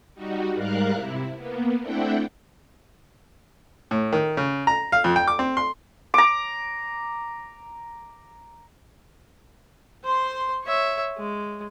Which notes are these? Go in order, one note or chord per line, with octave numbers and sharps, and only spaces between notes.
G3 D#4 F#4
G#2 G3 A#4 F5 F#6
C3 E4
A#3 B3
A3 C4 D4 E4 F#5 G5
A2
D#3
C#3
A#5
F5
F2
G5
D6
C4
C6
A#5 D6
C5 C6
C#5 E5
G#3